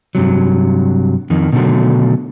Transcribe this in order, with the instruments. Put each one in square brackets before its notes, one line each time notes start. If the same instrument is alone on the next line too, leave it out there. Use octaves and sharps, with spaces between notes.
[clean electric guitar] G2 C3 F#3
F2 D#3
B2 D3 D#3 F3 F#3 A3